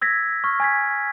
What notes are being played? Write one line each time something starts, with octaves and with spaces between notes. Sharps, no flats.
E6 G#6 A#6 B6
C#6 F6
G#5 G#6 B6